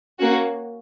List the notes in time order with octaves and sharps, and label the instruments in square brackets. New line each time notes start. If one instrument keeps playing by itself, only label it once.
[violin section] A#3 C#4 F#4